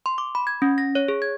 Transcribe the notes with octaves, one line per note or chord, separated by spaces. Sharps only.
C6
D6
B5
G#6
C#4
A#6
C#5
G#4
G#6